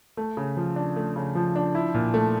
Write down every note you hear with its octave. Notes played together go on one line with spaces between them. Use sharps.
A3
C#3
F3
D4
A3
C#3
F3
D4
E4
A#2
A3